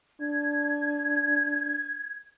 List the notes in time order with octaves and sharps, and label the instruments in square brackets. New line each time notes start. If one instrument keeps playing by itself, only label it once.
[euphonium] D4 [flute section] G#6